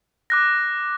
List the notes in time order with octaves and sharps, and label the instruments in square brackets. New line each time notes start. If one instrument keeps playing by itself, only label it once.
[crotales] D6 F#6 A#6